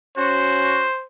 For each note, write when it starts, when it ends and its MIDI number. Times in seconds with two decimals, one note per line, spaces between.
0.17 0.83 61
0.17 0.83 66
0.17 1.04 72